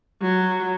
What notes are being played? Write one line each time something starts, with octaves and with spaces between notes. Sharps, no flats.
F#3